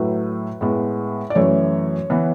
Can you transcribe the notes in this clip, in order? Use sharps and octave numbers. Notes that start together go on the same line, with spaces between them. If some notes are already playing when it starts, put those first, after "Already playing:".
Already playing: A2 F#3 A3 B4
A2 G#3 B3
D5
F#2 E3 A3 C#5
E3 B3